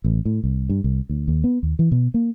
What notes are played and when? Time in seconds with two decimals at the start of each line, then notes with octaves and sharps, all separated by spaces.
0.04 A1
0.25 A2
0.44 C2
0.69 G2
0.84 C2
1.09 D2
1.28 D#2
1.44 B3
1.63 D#2
1.79 E3
1.92 B2
2.14 A#3